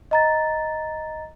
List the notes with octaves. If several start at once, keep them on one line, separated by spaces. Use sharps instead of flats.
D#5 A#5 A6